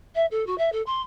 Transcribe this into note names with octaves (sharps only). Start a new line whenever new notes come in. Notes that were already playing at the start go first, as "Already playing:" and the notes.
E5
A4
F#4
E5
A4
C6